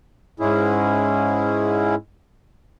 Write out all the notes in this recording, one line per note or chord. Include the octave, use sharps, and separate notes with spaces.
G#2 G#3 C#4 E4 G#4